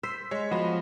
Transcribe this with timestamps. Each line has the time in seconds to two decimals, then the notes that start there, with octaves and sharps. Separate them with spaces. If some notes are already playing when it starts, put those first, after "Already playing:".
0.03 C5 E6 B6
0.31 G#3 C#5
0.52 F3 B3 F#4 D#5